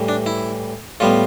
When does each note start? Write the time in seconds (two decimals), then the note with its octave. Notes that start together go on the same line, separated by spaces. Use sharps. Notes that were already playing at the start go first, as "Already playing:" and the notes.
Already playing: A2 E3 G3
0.08 D4
0.26 E4
1.00 A2 G3 B3 F4